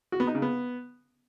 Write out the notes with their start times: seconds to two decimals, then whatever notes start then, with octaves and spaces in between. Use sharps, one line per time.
0.12 F#4
0.20 B3
0.27 D#4
0.35 C#3
0.42 B3